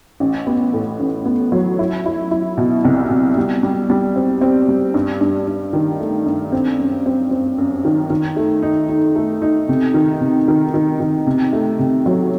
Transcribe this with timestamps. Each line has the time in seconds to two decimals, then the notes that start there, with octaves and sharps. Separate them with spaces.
0.20 A1
0.47 B3
0.73 A2
1.00 A1
1.26 B3
1.52 F#3
1.79 E4
2.06 E4
2.31 E4
2.58 B2
2.85 C2
3.10 B2
3.37 G3
3.63 G3
3.90 G3
4.16 C4
4.41 C4
4.69 G3
4.94 G2
5.21 G2
5.47 G2
5.73 D#3
5.99 A3
6.26 G2
6.52 C4
6.79 F#2
7.06 C4
7.31 C4
7.58 F#2
7.85 D#3
8.10 D#3
8.37 A3
8.63 D#4
8.89 D#4
9.16 A3
9.42 D#4
9.69 C3
9.94 D#3
10.21 C3
10.48 D#3
10.74 D#3
11.00 D#3
11.27 C3
11.53 A3
11.79 C3
12.06 F#3